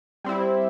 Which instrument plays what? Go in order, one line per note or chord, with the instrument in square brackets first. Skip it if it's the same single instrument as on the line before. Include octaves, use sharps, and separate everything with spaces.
[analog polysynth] G3 C4 E4